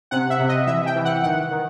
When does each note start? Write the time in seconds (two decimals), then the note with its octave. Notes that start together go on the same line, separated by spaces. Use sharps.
0.11 C3 F#5
0.30 E5
0.40 C3
0.49 D#5
0.67 E3 E5
0.86 G5
0.96 E3
1.05 F#5
1.23 D#3 F#5
1.51 D#3